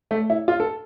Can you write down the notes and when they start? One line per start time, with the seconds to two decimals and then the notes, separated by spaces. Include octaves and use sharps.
0.11 A3
0.30 E4
0.48 F4
0.60 A4